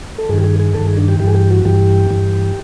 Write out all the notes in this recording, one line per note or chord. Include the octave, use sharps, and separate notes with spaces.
A4
G2 D#3 G#4
G4
G#4
G#4
G2 D#3 A4
G#4
D4
G4
G2 E3 G4
G#4
G4
F#4
G2 E3 G4
G2 E3